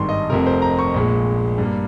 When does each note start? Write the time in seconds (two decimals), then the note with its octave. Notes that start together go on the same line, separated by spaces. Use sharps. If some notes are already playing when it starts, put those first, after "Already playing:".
Already playing: G#1 G2 D#3 G3 C6 C#6
0.09 D#5
0.30 F1 F2 C3 A#4
0.47 C5
0.62 A#5
0.79 C#6
0.94 A#1 A#2 G#3
1.58 G2 G3 A#3